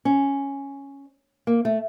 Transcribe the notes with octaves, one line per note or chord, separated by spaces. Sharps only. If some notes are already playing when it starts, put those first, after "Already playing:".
C#4
A#3
A3